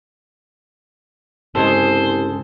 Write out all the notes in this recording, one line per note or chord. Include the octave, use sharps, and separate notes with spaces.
C2 G2 C#3 G#3 G#4 A4 C5